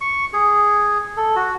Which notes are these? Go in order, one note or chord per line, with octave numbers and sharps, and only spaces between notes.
C#6
G#4
A4
F#4